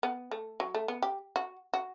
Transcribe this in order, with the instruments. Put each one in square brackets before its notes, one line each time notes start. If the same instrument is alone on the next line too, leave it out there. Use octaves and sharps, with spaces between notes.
[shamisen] B3
A3
F#3
A3
B3
G4
F#4
F#4